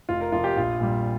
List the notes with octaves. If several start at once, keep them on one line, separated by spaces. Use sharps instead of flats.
F1 F4
A#4
F2 C3 F3 F4
G4
A#1 F4
A#2 G3